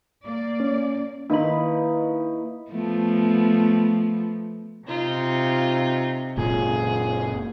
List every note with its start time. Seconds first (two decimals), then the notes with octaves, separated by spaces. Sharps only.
0.23 A#3 D5
0.60 C#4
1.30 D#3 A#3 D#4 E4 B4 B5
2.70 F3 A3 B3
4.87 C3 D#4 F4
6.37 F#1 A#2 G#4